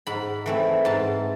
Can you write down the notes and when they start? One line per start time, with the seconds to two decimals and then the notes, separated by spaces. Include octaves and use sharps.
0.07 G#2 B5
0.46 E3 A3 C4
0.85 G#2 A5